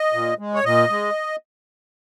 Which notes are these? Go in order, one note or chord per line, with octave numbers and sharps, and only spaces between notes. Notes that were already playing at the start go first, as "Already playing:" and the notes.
Already playing: D#5
A#2
G#3
C#5
A#2 D#5
G#3